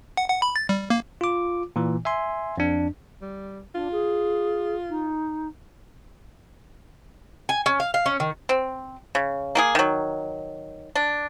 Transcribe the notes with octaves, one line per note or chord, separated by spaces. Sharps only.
F#5
F#5
B5
A6
G3
A#3
F4 D6
A#2 E3
E5 G#5 C6
F2 D4
G3
D4 F4
G#4
D#4
G#5
C#4
F5
F5
C#4
D#3
C4
C#3
A#3 G4 G#4
D#3 F#3
D4